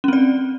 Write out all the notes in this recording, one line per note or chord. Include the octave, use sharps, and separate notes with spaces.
C4 C#4 D5